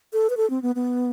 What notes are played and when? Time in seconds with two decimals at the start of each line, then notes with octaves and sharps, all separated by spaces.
0.13 A4
0.30 B4
0.37 A4
0.50 C4
0.62 B3
0.75 B3